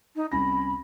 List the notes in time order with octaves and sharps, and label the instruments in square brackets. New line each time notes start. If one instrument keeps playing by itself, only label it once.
[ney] D#4
[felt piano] C2 C#4 A#6 [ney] B5